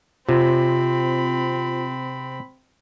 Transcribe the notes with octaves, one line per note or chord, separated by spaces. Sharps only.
C3 C4 F4 B5